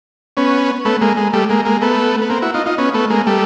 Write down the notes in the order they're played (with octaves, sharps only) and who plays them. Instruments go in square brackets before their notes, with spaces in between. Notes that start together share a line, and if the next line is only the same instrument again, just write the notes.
[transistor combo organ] B3 C#4
A3 B3
G#3 A#3
G#3
G3 A3
G#3 A#3
G#3 A#3
A3 B3
B3
A#3 C4
E4 F#4
D#4 F4
D#4 F4
B3 C#4
A3 B3
G#3 A#3
G3 A3